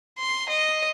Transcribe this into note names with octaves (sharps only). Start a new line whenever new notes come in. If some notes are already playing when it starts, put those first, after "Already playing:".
C6
D#5